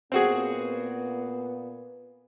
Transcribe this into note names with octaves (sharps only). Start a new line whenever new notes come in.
A#2 B3 C4 F#4 G#4